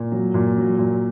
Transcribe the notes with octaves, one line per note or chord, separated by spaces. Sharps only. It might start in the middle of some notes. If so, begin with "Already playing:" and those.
Already playing: A#2
F#3
A#2
F#3
A#2